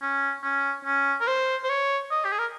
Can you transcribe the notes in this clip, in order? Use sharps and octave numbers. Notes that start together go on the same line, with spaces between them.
C#4
C#4
C#4
A#4
C5
C5
C#5
D#5
G4
G#4
A#4